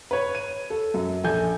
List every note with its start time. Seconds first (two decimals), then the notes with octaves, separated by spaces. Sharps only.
0.11 B4 C#5
0.35 D#7
0.70 A4
0.94 F#2
1.24 A#1 A4 G#5 G6